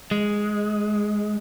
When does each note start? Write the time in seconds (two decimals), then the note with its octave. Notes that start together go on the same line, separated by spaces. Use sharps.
0.11 G#3